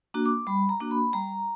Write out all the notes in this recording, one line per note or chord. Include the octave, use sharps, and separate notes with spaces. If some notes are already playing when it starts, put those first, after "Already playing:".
A#3 D4 F#4
D6
G3 B5
A#5
A#3 D4 F#4
B5
G3 A#5